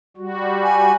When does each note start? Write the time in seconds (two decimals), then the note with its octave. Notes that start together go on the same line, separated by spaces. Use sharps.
0.17 G3 F#4
0.63 G#5